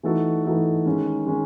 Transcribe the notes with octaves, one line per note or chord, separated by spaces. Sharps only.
E3 A3 D#4 F#4 A4
E3 A3 D#4 F#4 A4
D#3 G#3 C#4
D#3 G#3 C#4